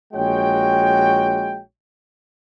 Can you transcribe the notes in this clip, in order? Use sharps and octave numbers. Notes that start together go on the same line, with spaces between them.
A#1 G#3 F#4 C#5 G5